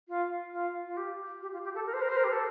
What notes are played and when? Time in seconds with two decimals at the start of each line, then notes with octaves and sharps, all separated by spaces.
0.08 F4
0.53 F4
0.85 F4
0.97 G4
1.42 G4
1.52 F4
1.64 G4
1.75 A4
1.86 A#4
1.93 C5
2.02 A#4
2.09 C5
2.17 A#4
2.24 G4
2.30 A4